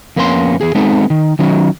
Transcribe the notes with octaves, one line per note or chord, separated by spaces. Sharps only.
F2 A#3 B3 C#4 F#4 C6
E2 G#4
G#3 B3 C4 D#4 A4
D#3
D#3 F#3 C#4